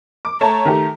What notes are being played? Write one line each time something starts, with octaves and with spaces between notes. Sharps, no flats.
D6
A3 C#5 A5 A#5
D#3 A3 G4